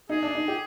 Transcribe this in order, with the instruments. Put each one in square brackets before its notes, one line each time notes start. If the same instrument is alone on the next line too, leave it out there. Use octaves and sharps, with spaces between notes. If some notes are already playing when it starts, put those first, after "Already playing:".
[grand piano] D#4 [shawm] G#4
[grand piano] D4
D#4
G4